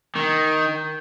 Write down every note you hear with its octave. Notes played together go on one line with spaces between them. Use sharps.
D#3